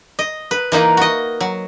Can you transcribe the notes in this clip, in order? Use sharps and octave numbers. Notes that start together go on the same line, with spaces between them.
D#5
B4
E3 A#3 D#4 B4
F#4 D#5
F#3